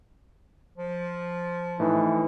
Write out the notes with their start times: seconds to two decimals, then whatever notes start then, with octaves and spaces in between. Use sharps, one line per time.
0.78 F3
1.80 A2 E3 D#4